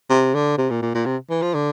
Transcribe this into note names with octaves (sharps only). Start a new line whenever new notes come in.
C3
D3
C3
A#2
A#2
A#2
C3
E3
F3
D3